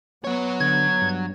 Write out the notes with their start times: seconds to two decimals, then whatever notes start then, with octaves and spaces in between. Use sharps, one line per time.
0.24 F#3 B3 C#5
0.60 D3 G#6
1.02 G2